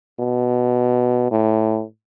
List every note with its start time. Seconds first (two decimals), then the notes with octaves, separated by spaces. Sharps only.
0.20 B2
1.31 A2